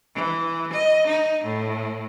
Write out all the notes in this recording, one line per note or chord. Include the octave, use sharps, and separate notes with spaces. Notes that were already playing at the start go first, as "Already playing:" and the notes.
E3
D#5
D#4
A2